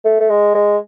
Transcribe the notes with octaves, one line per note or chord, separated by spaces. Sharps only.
A3
A3
G#3
G#3